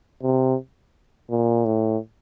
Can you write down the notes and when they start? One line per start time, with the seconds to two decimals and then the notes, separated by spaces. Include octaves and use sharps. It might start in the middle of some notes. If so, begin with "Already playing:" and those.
0.23 C3
1.30 A#2
1.65 A2